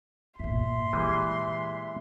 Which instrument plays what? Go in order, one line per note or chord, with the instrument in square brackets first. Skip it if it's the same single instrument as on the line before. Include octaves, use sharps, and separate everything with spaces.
[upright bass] G2 A#2 [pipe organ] E5 [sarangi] C6
[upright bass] A#2 [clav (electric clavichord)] E3 G3 G#3